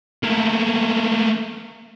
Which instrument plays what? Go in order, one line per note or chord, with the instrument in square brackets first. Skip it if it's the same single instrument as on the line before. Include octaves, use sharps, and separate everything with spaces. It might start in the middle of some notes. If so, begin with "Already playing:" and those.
[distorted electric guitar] A3 A#3